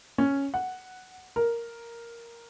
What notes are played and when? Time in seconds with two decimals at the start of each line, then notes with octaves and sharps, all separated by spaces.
0.18 C#4
0.54 F#5
1.36 A#4